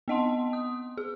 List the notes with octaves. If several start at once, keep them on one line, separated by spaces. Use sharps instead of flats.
B3 C4 D#5 F#5 A5 C6
D#6
G#4